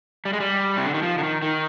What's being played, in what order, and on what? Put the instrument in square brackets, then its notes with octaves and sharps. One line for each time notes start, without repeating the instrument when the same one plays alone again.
[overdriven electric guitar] G3
G#3
G3
C3
D3
D#3
F3
D3
D#3
D#3